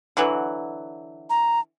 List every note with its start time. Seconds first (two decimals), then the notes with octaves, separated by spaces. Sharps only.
0.17 D3 E3 F#3
1.30 A#5